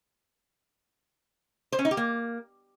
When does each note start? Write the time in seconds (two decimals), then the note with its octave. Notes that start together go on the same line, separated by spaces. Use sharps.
1.72 C5
1.79 C#4
1.85 D#4
1.91 G4
1.97 A#3